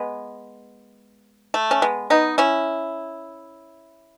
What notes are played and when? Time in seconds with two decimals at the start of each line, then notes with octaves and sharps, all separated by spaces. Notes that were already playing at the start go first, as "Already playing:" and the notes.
Already playing: G#3 B3
1.54 A3
1.71 C#4
1.82 G#3 B3
2.10 B3 D#4
2.38 C#4 E4